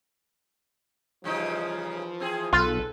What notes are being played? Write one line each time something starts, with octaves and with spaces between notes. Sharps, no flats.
C#3 E3 F3 G3 D#4
C4 G#4
B1 F4 A4 B4